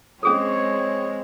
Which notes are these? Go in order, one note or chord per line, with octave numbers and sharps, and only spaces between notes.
G#3 C4 C#4 G#4 A4 C#5